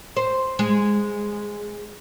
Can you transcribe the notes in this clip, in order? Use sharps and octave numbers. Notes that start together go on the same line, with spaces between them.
C5
G#3